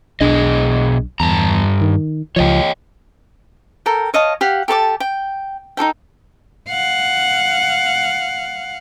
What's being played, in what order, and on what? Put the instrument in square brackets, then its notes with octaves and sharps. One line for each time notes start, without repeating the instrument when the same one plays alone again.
[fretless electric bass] B1 D4 [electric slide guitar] B2 G#4 D#5
[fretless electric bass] E2 [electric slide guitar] G2 A5 A#5
[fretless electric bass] D#3
[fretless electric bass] C#2 F3 [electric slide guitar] C#5 D#5 G5
[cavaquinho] A4 A#4 G5
C#5 D#5 F5 A5
G4 F5 F#5
G4 A4 A5 D6
G5
D#4 F#4 A4 G5
[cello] F5 F#5